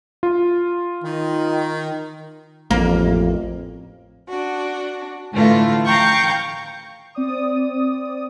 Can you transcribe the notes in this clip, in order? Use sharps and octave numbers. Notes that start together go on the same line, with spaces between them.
F4
D#3
A1 F2 A#3
D4 F#4
A2 D3 E3 A3 F4
F5 G5 A#5 C#6 G6
C4 D5 D#6